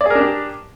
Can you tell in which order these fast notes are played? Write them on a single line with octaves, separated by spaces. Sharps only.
D5 G#4 A#4 D4 G4